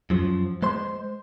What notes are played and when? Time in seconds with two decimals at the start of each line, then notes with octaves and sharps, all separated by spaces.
0.10 F#2 F3
0.62 G#3 C5 C6